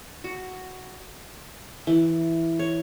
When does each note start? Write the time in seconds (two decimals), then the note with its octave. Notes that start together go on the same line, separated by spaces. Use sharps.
0.24 F#4
1.87 E3
2.59 C#5